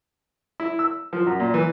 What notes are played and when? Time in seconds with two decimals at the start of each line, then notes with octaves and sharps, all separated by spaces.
0.60 E4
0.79 E6
1.13 F3
1.26 F#2
1.40 A#2
1.54 E3